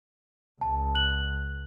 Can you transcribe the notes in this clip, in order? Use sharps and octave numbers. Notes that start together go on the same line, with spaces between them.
C#2 A5
F#6 F#7